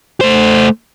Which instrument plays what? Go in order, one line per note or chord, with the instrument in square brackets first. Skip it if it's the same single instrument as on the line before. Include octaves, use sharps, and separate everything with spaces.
[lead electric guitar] A3 C5